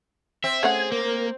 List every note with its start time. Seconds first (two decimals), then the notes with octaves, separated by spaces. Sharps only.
0.44 C4 E5
0.63 A3 C#4 G#4 F#5 G#6
0.92 A#3 A#4